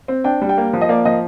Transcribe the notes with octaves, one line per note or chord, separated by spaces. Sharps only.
C4
D4 G5
G3
G5
A#3
F3
D#5
A#3 D5
F3 D#5